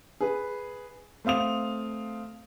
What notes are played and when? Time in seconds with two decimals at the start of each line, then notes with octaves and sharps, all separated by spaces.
0.21 G#4 B4
1.25 A3 C4 F5 D#6 F7